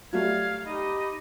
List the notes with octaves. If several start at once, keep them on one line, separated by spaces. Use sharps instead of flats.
F#3 G3 A3 D5 F5 G#6
D#4 G4 D#5 B5